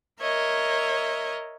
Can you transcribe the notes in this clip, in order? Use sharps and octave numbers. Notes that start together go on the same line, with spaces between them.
A#4 C#5 D#5 E5